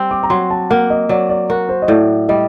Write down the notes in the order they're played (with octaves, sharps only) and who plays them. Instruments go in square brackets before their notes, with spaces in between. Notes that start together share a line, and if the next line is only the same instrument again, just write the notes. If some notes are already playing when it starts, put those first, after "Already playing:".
Already playing: [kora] G3 C4
[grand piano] D6
A#5
[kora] F#3 [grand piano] C6
[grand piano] A5
[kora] A#3 [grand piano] F#5
[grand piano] D#5
[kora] F#3 [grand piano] D5
[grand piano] D5
[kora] F#4 [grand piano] A#4
[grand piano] C5
D#5
[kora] A2 [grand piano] D5
[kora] G3 [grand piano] D#5